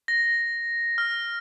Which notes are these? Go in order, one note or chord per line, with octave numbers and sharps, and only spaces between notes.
A#6
F6